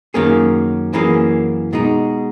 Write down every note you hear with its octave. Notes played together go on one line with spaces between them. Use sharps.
F#2 D#3 A#3 C#4 G#4
F#2 E3 A#3 C#4 G#4
B2 G#3 D#4